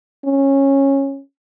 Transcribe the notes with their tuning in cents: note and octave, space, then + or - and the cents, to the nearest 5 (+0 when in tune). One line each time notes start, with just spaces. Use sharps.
C#4 -15